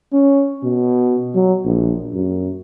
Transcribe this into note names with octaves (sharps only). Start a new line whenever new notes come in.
C#4
B2
F#3
A#1
F#2